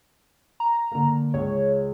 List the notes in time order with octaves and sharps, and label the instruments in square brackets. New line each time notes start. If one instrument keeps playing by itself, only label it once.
[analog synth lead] A#5
[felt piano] D3 A#3
[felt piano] C#2 G#4 [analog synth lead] C#5